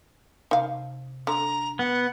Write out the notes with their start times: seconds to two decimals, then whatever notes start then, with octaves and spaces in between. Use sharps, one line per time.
0.51 C3 D#4 F5 A5
1.27 D3 A#5
1.79 B3 F#5